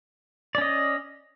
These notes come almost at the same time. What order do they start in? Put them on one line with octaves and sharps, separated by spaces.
D5 C#4 D#5